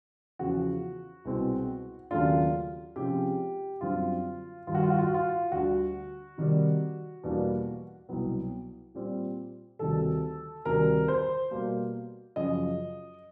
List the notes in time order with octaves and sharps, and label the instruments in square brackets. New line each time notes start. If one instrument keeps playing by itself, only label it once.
[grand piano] E2 C#3 F3 F#4
C2 B2 G#3 C4
D#2 C#3 F#3 A3 D4 F4
C3 F3 G#3 C#4 G4
F#2 D3 G3 C4 F4
G2 D#3 G3 F4
F#4
F4
F#4
F4
F#4
F4
D2 D3 G3 F#4
C3 D#3 G3
E2 B2 G3 A#3 D4
C2 B2 F#3 B3
A#2 G3 C4
D2 C3 D#3 G3 A4
D2 C3 D#3 G3 A#4
C5
B2 G3 A#3
F#2 C#3 F3 D#5